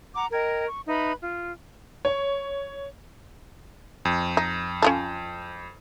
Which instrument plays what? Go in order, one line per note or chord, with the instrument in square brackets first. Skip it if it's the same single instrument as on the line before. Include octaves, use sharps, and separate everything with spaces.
[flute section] F#5 A#5 D6
A#4 D#5 G5 G#6
C#6
D#4 B4 E5 B5
F4
[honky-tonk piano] C#5
[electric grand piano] F2
[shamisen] D#4
C#4 F4 A4